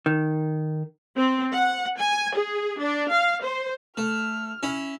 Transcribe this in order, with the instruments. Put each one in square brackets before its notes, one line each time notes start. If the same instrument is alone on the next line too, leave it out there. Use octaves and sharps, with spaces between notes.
[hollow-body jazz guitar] D#3
[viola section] C4
F#5
G#5
G#4
D4
F5
C5
[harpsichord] A3 [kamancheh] F6
[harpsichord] C#4 E4